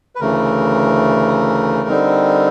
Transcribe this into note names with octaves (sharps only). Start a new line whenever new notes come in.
B4
D2 C#3 E3 A3 A#4
D3 G3 C4 D#4